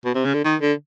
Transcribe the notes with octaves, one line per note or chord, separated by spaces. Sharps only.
B2
C3
C#3
D3
D#3
D3